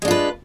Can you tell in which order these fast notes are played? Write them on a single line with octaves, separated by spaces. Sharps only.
G#3 D4 F4 B4